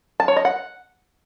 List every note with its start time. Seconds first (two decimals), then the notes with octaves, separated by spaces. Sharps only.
0.20 A5
0.28 C#5
0.36 D#5
0.45 F#5